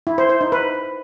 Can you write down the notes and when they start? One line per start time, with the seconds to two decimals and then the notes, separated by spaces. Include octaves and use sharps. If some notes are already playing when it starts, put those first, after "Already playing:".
0.07 E4
0.18 C5
0.29 C5
0.41 D#4
0.52 B4